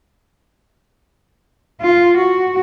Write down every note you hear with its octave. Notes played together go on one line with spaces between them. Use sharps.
F4
F#4